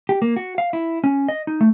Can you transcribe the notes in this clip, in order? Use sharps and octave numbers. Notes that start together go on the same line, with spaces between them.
G4
A#3
F#4
F5
E4
C#4
D#5
D#4
A3